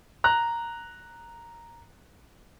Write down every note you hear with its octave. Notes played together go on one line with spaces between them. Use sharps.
A#5 F#6